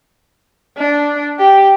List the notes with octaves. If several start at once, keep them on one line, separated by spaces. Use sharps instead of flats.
D4
G4